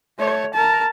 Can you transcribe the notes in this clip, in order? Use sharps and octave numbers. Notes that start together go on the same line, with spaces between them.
A3 C#5
A#4 A5